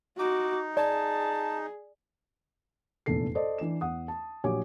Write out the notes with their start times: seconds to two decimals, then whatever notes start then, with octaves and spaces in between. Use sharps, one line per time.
0.19 D#4 F#4 D6
0.77 G#4 D5 A5
3.06 F1 A#1 E2 A4 C7
3.35 A4 C5 D5 D#5
3.58 E3 D4 E7
3.81 E2 F#5 D#6
4.08 A5
4.44 A#1 F#3 G4 C#5 G#5 D6